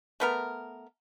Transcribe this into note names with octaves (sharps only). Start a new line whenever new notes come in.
A3 B3 A#4